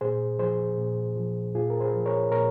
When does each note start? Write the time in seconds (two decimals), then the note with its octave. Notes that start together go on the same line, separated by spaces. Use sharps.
0.01 A#2 G#4 C5
0.39 F3 G#4 C5
0.78 A#2
1.16 F3
1.55 A#2 F4 G#4
1.70 A#4
1.81 G#4 C5
1.93 F3
2.06 A#4 C#5
2.31 A#2 A#4 C#5